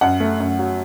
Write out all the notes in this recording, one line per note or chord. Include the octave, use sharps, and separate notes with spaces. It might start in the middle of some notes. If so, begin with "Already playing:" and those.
F#2 F#5
A3
F#2
F#3